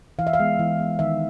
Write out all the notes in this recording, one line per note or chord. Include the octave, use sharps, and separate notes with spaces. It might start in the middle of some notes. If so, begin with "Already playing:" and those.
E3 F5
E5
F5
G#3 B3
E3
G#3 B3
D#3 E5